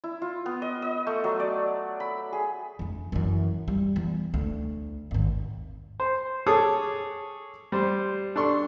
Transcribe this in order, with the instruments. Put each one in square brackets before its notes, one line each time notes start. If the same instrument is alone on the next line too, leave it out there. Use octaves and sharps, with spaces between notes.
[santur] E4
F4
B3
D#5
D#5
A3
F#3
D5
B5
G#4
[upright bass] F2 D3
F#2 E3
G3
E2
D2
G#1 D#2
[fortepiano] C5
G#4 A4 C#5 D6 D#6
G3 C5
D4 A4 C6 C#6